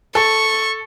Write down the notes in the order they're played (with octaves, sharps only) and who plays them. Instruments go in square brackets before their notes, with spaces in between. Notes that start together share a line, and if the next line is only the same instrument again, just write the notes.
[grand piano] A4 [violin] C#6